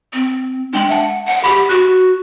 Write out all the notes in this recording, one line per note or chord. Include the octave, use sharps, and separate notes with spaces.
C4
G#3 D4 G5 F#7
E5 F#5 A5
F#5
G4 B5
F#4 F#6